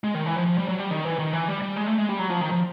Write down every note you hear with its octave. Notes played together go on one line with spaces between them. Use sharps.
G#3
D#3
E3
F3
F3
G3
F#3
G3
D#3
E3
D#3
E3
G3
G3
G#3
A3
G#3
G3
F#3
F3
D#3
F3